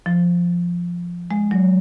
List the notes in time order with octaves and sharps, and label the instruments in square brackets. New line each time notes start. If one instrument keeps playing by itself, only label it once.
[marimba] F3
G#3
F#3